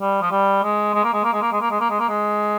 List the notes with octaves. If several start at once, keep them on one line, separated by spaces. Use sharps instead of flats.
G3
F3
G3
G#3
G#3
A#3
G#3
A#3
G#3
A#3
G#3
A#3
G#3
A#3
G#3
A#3
G#3